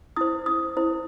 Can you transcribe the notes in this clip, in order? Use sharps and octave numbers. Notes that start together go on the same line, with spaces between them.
E4 C5 D#6
D#6
E4 C5